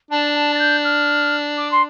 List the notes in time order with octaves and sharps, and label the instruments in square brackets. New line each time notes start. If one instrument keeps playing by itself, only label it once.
[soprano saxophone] D4 [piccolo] A5
[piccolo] A5
A6
G6
F6
D6
C6